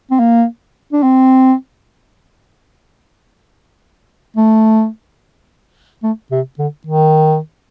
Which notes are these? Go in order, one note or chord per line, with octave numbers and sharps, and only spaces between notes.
C4
A#3
D4
C4
A3
A3
C3
D3
D#3